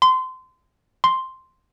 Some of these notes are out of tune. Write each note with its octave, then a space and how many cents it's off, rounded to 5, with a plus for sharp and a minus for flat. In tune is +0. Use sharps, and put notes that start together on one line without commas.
C6 -25
C6 +0